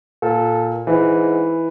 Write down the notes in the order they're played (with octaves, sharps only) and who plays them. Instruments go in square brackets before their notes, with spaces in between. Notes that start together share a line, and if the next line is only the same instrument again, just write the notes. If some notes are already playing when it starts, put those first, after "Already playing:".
[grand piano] A#2 [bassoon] A4
[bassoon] G#2 [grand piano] E3